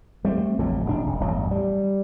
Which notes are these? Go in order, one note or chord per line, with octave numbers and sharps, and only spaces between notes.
G3 A3 C4
A1 F2 D3 F#3
D#1 G#2 D4
F1
D1 G1 E2 F#3
G3